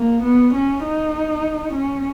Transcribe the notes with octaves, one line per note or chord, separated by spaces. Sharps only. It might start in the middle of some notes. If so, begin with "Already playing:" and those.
Already playing: A#3
B3
C#4
D#4
C#4